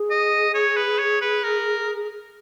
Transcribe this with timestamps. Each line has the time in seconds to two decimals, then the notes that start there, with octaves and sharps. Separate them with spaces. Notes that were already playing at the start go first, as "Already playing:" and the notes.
Already playing: G#4
0.10 D#5
0.54 C#5
0.77 B4
0.99 C#5
1.21 B4
1.44 A#4